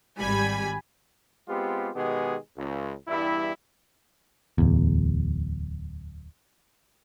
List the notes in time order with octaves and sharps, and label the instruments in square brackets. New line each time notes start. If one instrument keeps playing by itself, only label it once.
[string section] G#1 G3 G#5 B5
[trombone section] G#3 B3 C4 F4 G4
B2 D#3 G#3 B3 G4 G#4
C#2
E2 G2 G3 E4
[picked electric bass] D1 E2